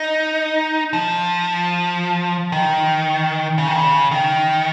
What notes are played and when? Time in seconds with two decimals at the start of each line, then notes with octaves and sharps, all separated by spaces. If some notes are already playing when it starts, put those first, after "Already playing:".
Already playing: D#4
0.93 F3
2.52 D#3
3.58 C#3
3.67 D#3
3.76 C#3
4.11 D#3